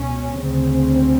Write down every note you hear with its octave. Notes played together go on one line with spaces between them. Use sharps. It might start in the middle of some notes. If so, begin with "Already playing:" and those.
Already playing: C#2 B2 C#4
D2 C#3 C4